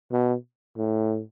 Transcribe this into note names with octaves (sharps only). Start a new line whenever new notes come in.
B2
A2